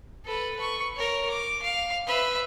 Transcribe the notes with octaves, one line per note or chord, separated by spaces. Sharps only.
A4 B4
B4 C#6
A#4 C#5
D6
F5
B4 E5